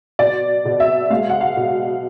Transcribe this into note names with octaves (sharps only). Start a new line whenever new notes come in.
B2 D5
B2
E5
G#3 F5
F#5
F5
B2